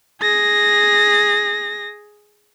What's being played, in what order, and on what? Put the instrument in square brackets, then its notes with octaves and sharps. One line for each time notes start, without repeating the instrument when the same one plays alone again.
[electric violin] G#4 A#6